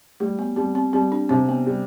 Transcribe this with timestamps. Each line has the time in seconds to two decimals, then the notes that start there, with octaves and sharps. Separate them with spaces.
0.20 G3 A3
0.39 B3
0.56 G3 C4
0.75 C4
0.93 G3 C4
1.12 D4
1.29 C3 C4
1.49 B3
1.66 G3